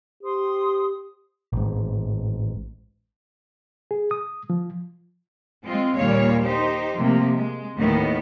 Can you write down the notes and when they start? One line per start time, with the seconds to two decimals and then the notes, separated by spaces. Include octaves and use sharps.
0.23 G4 C5 C6 D#6
1.53 A1 G#2
3.91 G#4
4.11 D#6
4.50 F3
5.65 G#3 C4 F4
5.96 D#2 A#2 G3 C#5 F5
6.43 D#4 G4 C5
6.96 C3 F3 A3 A#3
7.31 G#3
7.77 D#2 A2 D#3 B3